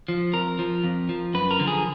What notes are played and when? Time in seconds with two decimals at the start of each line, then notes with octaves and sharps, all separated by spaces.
0.08 F3
0.33 F2 A#4
0.59 F3
0.84 F2
1.09 F3
1.34 F#2 B4
1.51 A#4
1.60 D3 F3
1.67 G#4